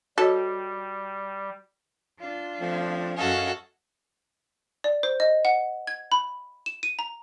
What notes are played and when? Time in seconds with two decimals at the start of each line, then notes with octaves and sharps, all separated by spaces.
0.18 G3 F#4 A4 C#5 D#5
2.19 D4 F4
2.60 F3 A3 C4
3.17 F#2 C#4 F#4 A4 D#5 F5 G#5
4.84 D5
5.03 C5
5.20 D#5
5.45 F#5
5.87 G#6
6.12 B5
6.66 E7
6.83 D#7
6.99 A#5